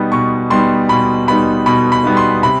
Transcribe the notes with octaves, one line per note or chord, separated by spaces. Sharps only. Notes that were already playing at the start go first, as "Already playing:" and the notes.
Already playing: B2 G3 B3 D#4
B2 C#6
G3 B3 D#4 C6
B2 B5
G3 B3 D#4 B5
B2 B5
B5
G3 B3 D#4
C6
C3 B5